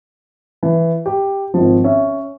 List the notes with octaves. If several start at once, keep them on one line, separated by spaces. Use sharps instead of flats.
E3
G4
G#1 F3
C#4 E5